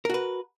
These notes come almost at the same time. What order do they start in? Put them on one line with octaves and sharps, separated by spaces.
A#4 F#4 B4